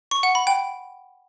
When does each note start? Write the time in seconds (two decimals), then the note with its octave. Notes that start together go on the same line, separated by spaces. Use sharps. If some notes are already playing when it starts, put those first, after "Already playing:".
0.11 C#6
0.23 F#5
0.35 B5
0.47 G5